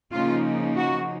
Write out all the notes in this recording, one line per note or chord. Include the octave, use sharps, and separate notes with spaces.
C#3 F3 A#3 D#4 F4
F#4